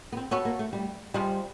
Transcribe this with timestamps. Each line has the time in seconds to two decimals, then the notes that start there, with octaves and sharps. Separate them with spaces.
0.12 B3
0.17 C4
0.31 B3 C#4 F#4 A4
0.45 A#3
0.59 A3
0.73 G3
1.14 C3 F3 G3 G#3